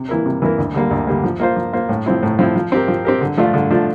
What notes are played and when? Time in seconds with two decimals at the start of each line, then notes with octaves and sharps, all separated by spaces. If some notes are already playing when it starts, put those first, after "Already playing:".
Already playing: C3
0.09 E3 A#3 E4 A#4
0.26 C3
0.42 E3 A#3 E4 A#4
0.58 D2
0.74 D3 G3 A#3
0.91 D2
1.07 D3 G3 A#3
1.24 F3
1.40 A#3 F4 C5
1.56 F3
1.73 A#3 F4 C5
1.89 A2
2.06 F3 C4 E4
2.23 A2
2.39 F3 C4 E4
2.56 F3
2.72 C4 G4 A#4
2.88 F3
3.05 C4 G4 A#4
3.21 D3
3.37 F3 A3 D4 F4
3.54 D3
3.71 F3 A3 D4 F4